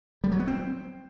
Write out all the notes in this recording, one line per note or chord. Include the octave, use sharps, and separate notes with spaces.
G3
F#3
B3
C4